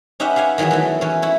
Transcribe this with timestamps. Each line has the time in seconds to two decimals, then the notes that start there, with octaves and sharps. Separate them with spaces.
0.20 C#4 D#4 G4 B4 E5 F#5
0.36 G4 F5 F#5 G#5
0.58 D#3 E3 F#3 B3 G#4
0.71 F#3 A3 E4
1.01 E3 C#4
1.22 E4 C#5